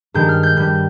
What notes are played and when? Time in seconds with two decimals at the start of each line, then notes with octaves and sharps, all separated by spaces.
0.14 G2 D#3 G#3 G6
0.29 F6
0.43 G6
0.57 G2 G3 G6